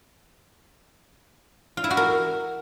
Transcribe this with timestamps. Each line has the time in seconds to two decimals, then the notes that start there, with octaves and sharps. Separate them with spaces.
1.77 F4
1.84 E4
1.90 F#4
1.97 A#4